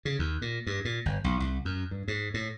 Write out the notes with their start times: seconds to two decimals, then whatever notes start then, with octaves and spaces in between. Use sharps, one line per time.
0.05 C#3
0.19 D#2
0.42 A#2
0.67 G2
0.85 A#2
1.06 G1
1.24 B1
1.40 C2
1.65 F#2
1.91 G2
2.08 G#2
2.34 A2